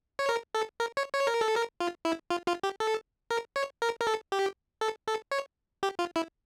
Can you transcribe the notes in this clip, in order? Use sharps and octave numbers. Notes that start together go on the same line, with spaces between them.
C#5
A#4
A4
A#4
C#5
C#5
A#4
A4
A#4
F4
E4
F4
F4
G4
A4
A#4
C#5
A#4
A#4
A4
G4
A4
A4
C#5
G4
F4
E4